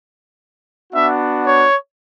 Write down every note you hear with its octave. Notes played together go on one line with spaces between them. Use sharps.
B3 D4 F#4 E5
C#5